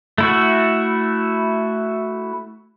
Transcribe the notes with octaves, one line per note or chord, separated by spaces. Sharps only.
A3 E4 F#4